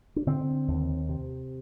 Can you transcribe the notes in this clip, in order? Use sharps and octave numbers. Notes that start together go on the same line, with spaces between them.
D4
D3 C4
D#2
C3